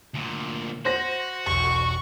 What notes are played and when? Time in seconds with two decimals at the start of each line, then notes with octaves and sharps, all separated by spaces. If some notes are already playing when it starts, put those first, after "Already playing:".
0.14 D2 A#2
0.85 F#4 C5 A#6
1.47 E1 B1 C#6